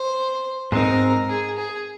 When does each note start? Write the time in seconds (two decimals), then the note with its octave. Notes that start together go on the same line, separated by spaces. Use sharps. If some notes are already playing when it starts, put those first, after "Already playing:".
Already playing: C5
0.72 G#2 G#3 C4 D#4 A#4
1.29 G#4
1.58 G#4